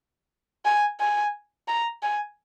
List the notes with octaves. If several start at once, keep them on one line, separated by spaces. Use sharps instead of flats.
G#5
G#5
A#5
G#5